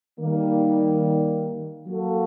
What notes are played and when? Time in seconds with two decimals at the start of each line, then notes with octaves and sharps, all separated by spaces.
0.18 D#3 G3 A#3
1.86 F#3 A#3 F#4 A4